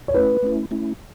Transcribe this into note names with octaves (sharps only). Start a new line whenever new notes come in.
C#5
A3 C#4 E4 B4
A3 C#4 E4
A3 C#4 E4